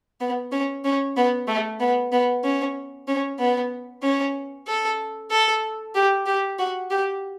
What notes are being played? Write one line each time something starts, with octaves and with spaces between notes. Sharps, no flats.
B3
C#4
C#4
B3
A3
B3
B3
C#4
C#4
B3
C#4
A4
A4
G4
G4
F#4
G4